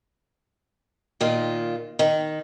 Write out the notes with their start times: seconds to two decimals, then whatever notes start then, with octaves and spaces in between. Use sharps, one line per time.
1.21 A#2 D#3 F4
1.99 D#3